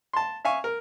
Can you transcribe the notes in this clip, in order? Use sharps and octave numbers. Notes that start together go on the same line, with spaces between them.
A5 C6
E5 F5 G#5 C#6
A#4